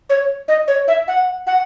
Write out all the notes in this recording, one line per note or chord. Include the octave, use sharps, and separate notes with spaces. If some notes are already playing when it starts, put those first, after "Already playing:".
C#5
D#5
C#5
E5
F#5
F#5